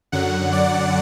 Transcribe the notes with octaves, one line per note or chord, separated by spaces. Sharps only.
F#2 D3 F#3 F#5
D5